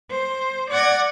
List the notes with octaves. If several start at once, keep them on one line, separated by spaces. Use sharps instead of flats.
C5
D5 F#5 G#6 A#6